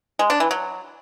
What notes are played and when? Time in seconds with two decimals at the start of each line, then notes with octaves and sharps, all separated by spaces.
0.19 G#3
0.30 D4
0.40 E3
0.51 F#3